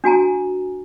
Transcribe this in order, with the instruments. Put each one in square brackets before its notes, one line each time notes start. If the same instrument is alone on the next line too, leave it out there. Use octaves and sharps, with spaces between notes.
[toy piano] D4 F#4 G#5 A#5